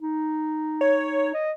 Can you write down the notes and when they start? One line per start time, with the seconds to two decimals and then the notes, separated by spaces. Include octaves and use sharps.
0.01 D#4
0.81 C#5
1.34 D#5